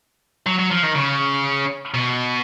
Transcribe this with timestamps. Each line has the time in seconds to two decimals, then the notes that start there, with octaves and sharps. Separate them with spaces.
0.47 F#3
0.59 F#3
0.71 F3
0.83 D#3
0.96 C#3
1.94 B2